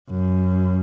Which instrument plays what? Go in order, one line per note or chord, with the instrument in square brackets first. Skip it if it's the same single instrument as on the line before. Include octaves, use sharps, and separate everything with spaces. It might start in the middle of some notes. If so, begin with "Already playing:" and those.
[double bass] F#2